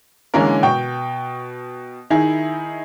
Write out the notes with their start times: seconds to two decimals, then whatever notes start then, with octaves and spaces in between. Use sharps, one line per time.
0.34 D3 E3 G#3 A#3 C#4 A#4
0.63 B2 G5 C#6
2.10 D#3 D#4 E4 G#4